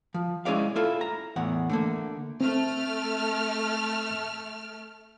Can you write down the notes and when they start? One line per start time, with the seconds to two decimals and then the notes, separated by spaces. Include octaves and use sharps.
0.14 F3
0.45 G#3 C#4 E4 G#4 D5 F5
0.76 E4 F4 A4
1.01 A#5
1.36 E2 A2 F#5
1.70 D3 A3 A#3
2.41 A3 C4 F6